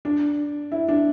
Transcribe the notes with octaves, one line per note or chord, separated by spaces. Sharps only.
D4
E4
D4